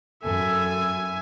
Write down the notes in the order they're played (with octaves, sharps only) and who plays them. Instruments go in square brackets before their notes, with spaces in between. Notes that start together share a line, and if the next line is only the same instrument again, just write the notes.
[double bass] F#2 [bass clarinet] A4 [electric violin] E5 G#5